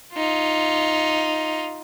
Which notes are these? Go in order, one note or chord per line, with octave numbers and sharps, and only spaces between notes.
D#4 F4